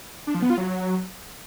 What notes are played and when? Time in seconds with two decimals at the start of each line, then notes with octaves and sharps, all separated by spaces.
0.27 D4
0.35 F3
0.42 B3
0.50 F4
0.58 F#3